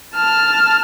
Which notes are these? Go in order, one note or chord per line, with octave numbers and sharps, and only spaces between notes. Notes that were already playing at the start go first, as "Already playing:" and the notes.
A5 F6